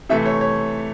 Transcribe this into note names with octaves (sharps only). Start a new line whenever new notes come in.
C3 E3 A3 E5
C#5
C#5